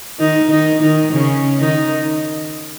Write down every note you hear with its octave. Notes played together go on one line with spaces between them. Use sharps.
D#3 D#4
D#3 D#4
D#3 D#4
C#3 C#4
D#3 D#4